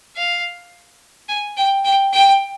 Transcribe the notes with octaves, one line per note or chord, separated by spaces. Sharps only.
F5
G#5
G5
G5
G5